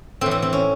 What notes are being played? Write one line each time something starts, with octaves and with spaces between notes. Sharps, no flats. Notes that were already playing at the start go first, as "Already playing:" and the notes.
A2 E3 C4
C4
C4
C#4